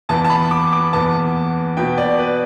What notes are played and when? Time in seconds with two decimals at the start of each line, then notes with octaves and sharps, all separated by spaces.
0.09 E2 E3 B3 A5
0.24 A5
0.30 B5
0.51 D6
0.72 D6
0.93 E2 E3 B3 A5
1.77 B2 B3 G5
1.98 D5
2.19 B4